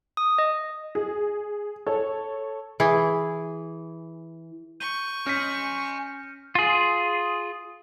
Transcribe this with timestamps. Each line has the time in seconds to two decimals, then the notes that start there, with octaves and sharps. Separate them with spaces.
0.17 D#6
0.38 D#5
0.95 G#4
1.87 A4 C#5
2.80 E3 G#4
4.80 C#6 G6 D#7 G7
5.26 C#4 G#5 C6 F6 G6 A#6 B6 C#7
6.55 F4 G#4